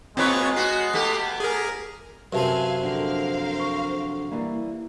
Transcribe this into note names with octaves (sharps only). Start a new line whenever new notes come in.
A#2 G#3 C4 F4 B4 C#5 C#6
B3 F#4 C7
A3 B3 G4
G#4 A#4
F#2 C3 C4 B4 E5 F5 G#5 A5
F2 D3 A#4 C5 F5
C#6
E3 G3 A#3